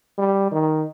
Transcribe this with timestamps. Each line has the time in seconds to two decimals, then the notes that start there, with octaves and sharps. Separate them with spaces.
0.18 G3
0.52 D#3